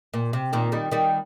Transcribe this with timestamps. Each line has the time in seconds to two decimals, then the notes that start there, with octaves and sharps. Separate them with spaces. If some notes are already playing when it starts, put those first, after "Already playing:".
0.14 A#2
0.33 C3
0.53 A#2 D#3
0.72 D#3 G3
0.92 D#3 G3